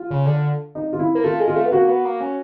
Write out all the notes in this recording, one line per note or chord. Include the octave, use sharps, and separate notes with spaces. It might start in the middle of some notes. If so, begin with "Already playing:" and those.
Already playing: F4
C#3
D3
D#4
F4
E4
A#3
A3 F4
G#3
F4
A3
B3
A#3 F#4
B3
A#3
C#4